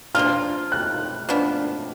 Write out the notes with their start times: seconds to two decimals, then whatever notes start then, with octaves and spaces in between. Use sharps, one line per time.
0.15 F3 A#3 D4 F4 F6
0.72 F#6
1.29 F3 B3 D4